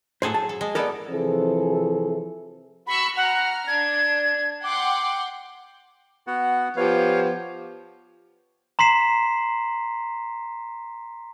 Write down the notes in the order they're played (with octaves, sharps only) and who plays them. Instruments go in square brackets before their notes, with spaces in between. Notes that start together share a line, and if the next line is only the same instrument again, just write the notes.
[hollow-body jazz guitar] A2 C5 [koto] F#3 G#4 A4
[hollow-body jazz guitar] A5
[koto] A4
G#3
[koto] B3 E4 A4 [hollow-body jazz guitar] A#4 D5
[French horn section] C3 E3 F3 C4 G#4 A4
[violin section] F#4 C#6 E6 [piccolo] B5
[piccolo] F#5 [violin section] A#5 F6
[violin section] D4 [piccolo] G#6
[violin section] F#5 G5 C6 [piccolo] D6
[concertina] B3 F#4 F#5
[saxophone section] F3 B3 G4 [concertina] C#5 F5
[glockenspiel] A#5 C6 B6 C7 E7